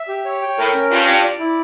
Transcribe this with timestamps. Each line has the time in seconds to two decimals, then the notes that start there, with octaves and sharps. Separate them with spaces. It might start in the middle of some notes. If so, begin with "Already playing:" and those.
Already playing: E5
0.08 G4
0.25 C#5
0.42 G5
0.58 A2 A#4
0.74 C#4
0.91 G2 F4
1.07 D5
1.24 D5
1.39 E4